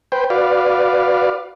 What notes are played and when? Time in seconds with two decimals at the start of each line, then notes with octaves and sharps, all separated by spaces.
0.12 B4 C5 G5
0.30 F#4 B4 D5 F5